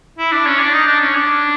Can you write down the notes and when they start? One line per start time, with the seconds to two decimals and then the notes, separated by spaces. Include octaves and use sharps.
0.18 E4
0.32 D4
0.46 C#4
0.60 D4
0.73 D#4
0.87 D4
1.01 C#4
1.15 D4